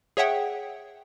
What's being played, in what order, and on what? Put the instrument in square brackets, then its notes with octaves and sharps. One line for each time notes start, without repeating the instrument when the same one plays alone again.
[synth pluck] G#4 C#5 E5 F#5 G5